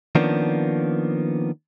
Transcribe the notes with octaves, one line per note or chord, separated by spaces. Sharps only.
D#3 F3 A#3 B3 C#4 D4